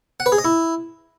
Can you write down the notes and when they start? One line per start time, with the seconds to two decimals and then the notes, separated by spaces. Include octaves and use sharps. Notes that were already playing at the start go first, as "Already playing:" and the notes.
0.20 F#5
0.26 B4
0.32 G#4
0.38 D#5
0.44 E4